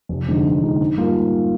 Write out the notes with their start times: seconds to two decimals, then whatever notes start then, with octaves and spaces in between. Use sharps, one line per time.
0.09 F1
0.27 F2 D3 G#3 D#4
0.45 F1
0.62 F2 D3 G#3 D#4
0.80 G#2
0.97 G3 A#3 F4